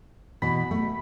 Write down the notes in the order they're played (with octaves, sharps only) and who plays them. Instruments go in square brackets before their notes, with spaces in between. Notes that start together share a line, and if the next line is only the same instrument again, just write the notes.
[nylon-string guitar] B2 E3 [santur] B5
[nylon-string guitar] A3